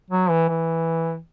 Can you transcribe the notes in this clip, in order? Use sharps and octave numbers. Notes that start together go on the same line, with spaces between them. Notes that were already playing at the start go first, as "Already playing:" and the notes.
F#3
E3
E3